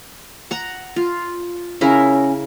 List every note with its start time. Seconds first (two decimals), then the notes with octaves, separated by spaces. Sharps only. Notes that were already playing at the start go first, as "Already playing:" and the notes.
0.51 F#5 A#5
0.96 F4
1.81 C#3 C#4 E4 A#4